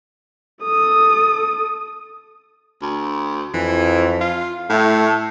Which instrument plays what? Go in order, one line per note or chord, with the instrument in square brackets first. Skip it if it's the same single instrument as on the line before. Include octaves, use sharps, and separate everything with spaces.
[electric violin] A4 D#6
[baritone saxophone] D2
[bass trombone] F2 [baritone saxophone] E3
[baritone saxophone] F4
[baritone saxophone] A2 [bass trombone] A3